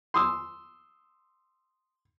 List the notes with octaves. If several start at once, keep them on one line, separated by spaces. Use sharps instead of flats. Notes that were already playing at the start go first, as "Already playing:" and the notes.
C6 D#6 E6